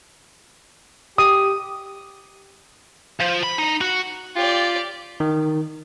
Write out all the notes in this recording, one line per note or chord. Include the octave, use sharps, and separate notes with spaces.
G4 D#6
F3
B5
D#4
F#4
F4 G4 D5
D#3